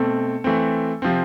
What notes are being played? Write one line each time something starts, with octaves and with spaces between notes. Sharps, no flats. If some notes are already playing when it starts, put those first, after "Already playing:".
Already playing: B2 A3 C4 A4
E3 A3 C4
C3 F3 C4